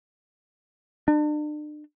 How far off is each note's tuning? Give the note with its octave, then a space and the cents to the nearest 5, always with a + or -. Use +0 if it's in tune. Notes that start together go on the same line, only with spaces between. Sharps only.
D4 +40